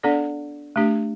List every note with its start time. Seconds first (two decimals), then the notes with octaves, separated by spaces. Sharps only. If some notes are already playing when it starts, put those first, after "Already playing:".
0.03 B3 D4 A4 D5
0.76 A3 D4 G4